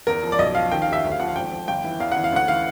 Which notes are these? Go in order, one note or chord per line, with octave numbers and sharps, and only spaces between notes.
E2 A#4
F3
D5
B1 D#5
F3 F5
D#3 G5
F5
D#2
E5
D2
F5
F3 F#5
F5
G#1 G5
F3
G1 G5
E3
E2 F5
F#5
E3
F5
D2 F#5
E3 F5